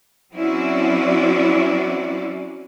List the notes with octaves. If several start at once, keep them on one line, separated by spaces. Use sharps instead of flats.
F#3 C4 C#4 E4 F#4 D5